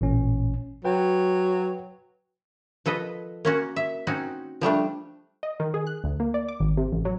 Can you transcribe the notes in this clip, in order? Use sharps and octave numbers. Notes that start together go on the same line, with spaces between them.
A1 A#2 C#4
F#3 B4 G5
F3 A4 B4 D#5
A#3 C#4 F#4
E5
C4 C#4 D#4 F#4
F3 G3 A3 D4
D#5
D#3
G#4
F#6
D2
A#3
D5
D6
G#1
C3
A1
F#3